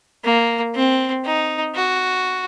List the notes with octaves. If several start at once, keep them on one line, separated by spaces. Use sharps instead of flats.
A#3
C4
D#4
F#4